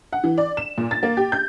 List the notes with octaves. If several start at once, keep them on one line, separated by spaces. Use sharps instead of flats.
F#5
E3
D5
E7
A#2
A6
A#3
G4
G6